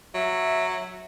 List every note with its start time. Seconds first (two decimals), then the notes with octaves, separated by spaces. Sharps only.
0.15 F#3 E5